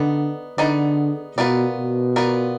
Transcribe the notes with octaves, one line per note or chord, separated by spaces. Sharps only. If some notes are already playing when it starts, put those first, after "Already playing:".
Already playing: D3 B3 D#4 D5
D3 B3 D#4 G#4 D5
B2 B3 F4 A#4 D5
B2
B3 F4 A#4 D5